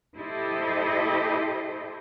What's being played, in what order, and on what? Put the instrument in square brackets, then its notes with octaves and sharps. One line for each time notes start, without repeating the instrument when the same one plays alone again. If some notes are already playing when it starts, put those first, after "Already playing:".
[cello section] E4 G4 A4 C5 D#5